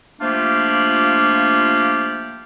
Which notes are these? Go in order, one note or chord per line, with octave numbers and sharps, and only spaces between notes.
F3 A3 A#3 D4 F4 G4